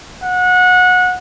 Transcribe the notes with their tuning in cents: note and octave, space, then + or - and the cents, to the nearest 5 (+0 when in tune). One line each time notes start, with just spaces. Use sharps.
F#5 -25